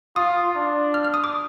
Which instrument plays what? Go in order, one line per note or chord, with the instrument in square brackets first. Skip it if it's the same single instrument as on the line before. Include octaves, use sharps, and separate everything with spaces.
[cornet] F4 [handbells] D#6
[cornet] D4
[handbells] F6
F6
D#6
D6